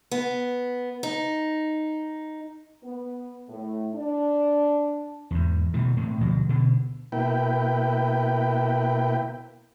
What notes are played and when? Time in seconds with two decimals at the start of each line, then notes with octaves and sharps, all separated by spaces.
0.11 B3
1.03 D#4
2.84 B3
3.49 A2
3.95 D4
5.31 E2 G#2
5.74 B2 D#3 E3
5.97 A2 C3
6.21 D2 B2 F3 F#3
6.49 B2 D3
7.12 B2 A#3 E4 B4 G5